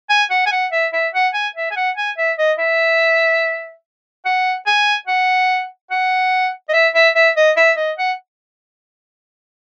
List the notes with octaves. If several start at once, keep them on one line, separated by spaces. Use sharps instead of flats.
G#5
F#5
G#5
F#5
E5
E5
F#5
G#5
E5
G#5
F#5
G#5
E5
D#5
E5
F#5
G#5
F#5
F#5
D#5
E5
E5
E5
D#5
E5
D#5
F#5